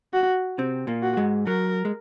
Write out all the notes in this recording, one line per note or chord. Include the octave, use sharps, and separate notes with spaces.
F#4
C3 C4
A#2 A#3
F#4
G#2 G#3
F#3 A#4
G#3